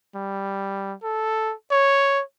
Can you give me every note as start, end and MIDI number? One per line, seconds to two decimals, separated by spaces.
0.15 0.95 55
1.04 1.54 69
1.71 2.22 73